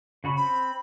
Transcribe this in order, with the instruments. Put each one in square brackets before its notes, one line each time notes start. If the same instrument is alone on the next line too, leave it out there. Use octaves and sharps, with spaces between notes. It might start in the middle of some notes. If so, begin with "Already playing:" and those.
[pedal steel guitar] C#3 F#4 B5
[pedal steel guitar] C4 [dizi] B5